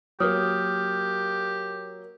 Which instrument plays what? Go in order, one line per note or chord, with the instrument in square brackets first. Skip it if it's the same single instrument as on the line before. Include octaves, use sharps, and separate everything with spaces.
[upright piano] F#3 A#3 [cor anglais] G4 [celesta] D#6 F6